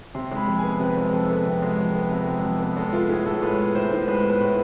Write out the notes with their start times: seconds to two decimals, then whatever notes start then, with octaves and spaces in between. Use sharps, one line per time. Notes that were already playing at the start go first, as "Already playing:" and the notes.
0.15 C3 C6
0.31 G#3
0.37 B5
0.48 F2
0.58 G#5
0.64 B3
0.80 C3 B4
0.97 G#3
1.13 F2 A4
1.29 B3
1.46 C3
1.62 G#3
1.79 F2
1.95 B3
2.11 C3
2.27 G#3
2.44 F2
2.60 B3
2.76 G#3 A4
2.93 B3 F4
3.09 A2 G#4
3.26 A2 A4
3.42 G#3 B4
3.58 B3
3.75 A2 C5
3.91 A2
4.07 G#3 B4
4.24 B3
4.30 B4
4.40 A2